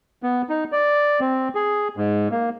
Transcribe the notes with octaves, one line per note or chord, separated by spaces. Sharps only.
B3
D#4
D5
C4
G#4
G#2
A#3